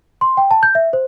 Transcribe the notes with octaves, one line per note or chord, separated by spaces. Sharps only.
C6
G5
A5
G6
E5
C5